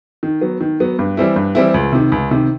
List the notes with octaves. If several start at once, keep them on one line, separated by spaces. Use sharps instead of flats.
D#3
F#3 B3
D#3
F#3 B3
G2
E3 G3 C4 E4
G2
E3 G3 C4 E4
C#2
C3 D#3
C#2
C3 D#3